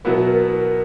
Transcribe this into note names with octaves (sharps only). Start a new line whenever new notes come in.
B2 F#3 B3 E4 A#4
B4
A#4